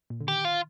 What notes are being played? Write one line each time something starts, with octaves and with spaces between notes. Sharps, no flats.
A#2
D3
D#3 G4
F4